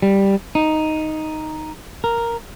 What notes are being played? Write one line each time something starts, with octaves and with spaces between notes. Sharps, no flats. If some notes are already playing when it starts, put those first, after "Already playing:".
G3
D#4
A#4